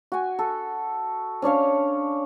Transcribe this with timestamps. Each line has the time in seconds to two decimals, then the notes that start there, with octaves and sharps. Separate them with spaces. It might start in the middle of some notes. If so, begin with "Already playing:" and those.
0.12 F#4 G#5
0.39 A4
1.42 C#4 D4 C#5 F5